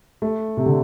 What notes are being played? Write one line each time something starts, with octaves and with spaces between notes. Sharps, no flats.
A3
C3
D3